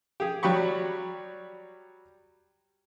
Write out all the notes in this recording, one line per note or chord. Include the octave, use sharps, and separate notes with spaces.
G4 G#4
F#3 G3 G4 B5 C#6